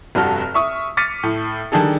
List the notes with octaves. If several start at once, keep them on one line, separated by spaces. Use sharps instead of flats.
F1 G2 F#4 A4 F6
E5 C#6 D#6
D6 F6 A6 B6 C#7 D#7
A2
D#3 G3 D4 G#4 A4